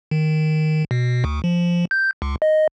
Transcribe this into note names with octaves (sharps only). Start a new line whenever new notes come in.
D#3
B2
D2
F3
G6
C#2
D#5